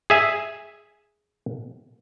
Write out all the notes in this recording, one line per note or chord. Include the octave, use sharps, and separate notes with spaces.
G#4 E5 G#5